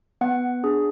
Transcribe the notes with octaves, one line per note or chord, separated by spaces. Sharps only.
B3 F#5
D4 G#4